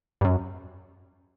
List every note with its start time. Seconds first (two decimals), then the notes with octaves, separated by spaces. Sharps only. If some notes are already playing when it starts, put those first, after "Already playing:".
0.21 G2
0.25 F#2